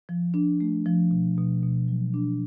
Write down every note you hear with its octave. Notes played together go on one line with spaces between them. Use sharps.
F3
D4
A3
F3
B2
B2
B2
F#3
D4